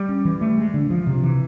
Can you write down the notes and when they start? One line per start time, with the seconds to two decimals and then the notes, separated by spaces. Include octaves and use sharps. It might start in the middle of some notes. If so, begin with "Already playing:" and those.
Already playing: G3
0.09 C#4
0.25 E3
0.41 A3
0.58 G#3
0.74 D3
0.90 F3
1.07 C3
1.23 E3